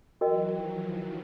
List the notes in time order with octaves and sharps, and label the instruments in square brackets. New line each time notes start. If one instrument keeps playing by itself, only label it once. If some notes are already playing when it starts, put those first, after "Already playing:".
[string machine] E3 F#3 [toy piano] F#4 A#4 D#5 G5
[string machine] D#3 F3